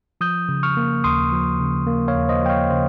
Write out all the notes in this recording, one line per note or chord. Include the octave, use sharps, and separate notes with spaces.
F3 D#6 G6
C#3
C#6 F6
A#3
D#2 C6 D#6
F3
C#3
A#3
C#5 F5
D#2
C5 D#5
F3 G5
C#5 F5
C#3 C5